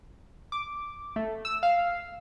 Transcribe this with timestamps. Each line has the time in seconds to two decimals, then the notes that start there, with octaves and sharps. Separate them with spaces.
0.52 D6
1.16 A3
1.45 E6
1.63 F5